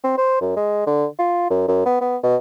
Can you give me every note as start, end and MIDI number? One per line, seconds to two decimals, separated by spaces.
0.04 0.17 60
0.17 0.40 72
0.41 0.54 42
0.57 0.85 56
0.87 1.06 50
1.19 1.49 65
1.50 1.64 42
1.68 1.81 42
1.86 2.00 59
2.01 2.17 59
2.23 2.36 47